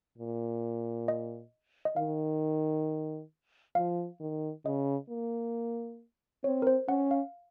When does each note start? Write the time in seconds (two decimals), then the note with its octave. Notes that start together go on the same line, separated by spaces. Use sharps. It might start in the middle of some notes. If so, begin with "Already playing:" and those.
0.18 A#2
1.08 D#5
1.85 D#5
1.96 D#3 F5
3.75 F3 F5
4.20 D#3
4.65 C#3 D#5
5.09 A#3
6.44 C4 C#5
6.62 A#4
6.67 C5
6.88 C#4 F#5
7.11 F5